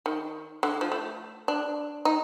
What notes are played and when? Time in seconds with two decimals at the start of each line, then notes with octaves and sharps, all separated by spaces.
0.06 D#3
0.63 D3
0.81 F3
0.92 A3
1.48 D4
2.05 D#4